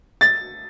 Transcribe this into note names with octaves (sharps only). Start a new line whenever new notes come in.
A6